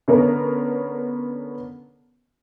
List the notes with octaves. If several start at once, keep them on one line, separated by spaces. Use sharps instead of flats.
D3 B3 C#4 A#4